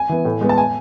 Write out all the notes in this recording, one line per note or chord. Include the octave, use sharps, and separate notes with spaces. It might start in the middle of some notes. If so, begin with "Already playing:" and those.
Already playing: G#5
E3 B3
A2
G#3 B3
A5
G#5